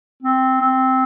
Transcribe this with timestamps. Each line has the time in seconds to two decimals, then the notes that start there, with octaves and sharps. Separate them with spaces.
0.23 C4
0.61 C4